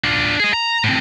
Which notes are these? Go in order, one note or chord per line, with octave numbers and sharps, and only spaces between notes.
D4 F4
G#4 D#5
A#5
A2 C4